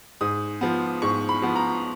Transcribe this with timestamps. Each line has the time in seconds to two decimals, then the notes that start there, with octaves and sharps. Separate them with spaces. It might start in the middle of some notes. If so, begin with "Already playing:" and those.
0.21 G#2 D#6
0.61 F3 B3
1.02 G#2 C#6
1.29 B5
1.42 F3 B3
1.55 A#5